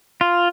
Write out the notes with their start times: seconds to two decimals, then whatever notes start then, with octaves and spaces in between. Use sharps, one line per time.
0.21 F4